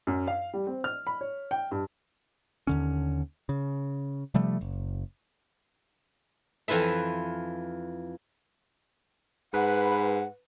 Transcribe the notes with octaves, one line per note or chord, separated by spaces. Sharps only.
F#2
F5
G3
C4
F6
B5
C#5
G5
G2
D#2 D3 C#4
C#3
C3 F3 G3 A3
F#1
F2 E3 F4 B4 E5
G#2 B4 F#5